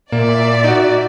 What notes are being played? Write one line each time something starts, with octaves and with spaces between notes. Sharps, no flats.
A#2 A#3 D5 E5
D#4 F#4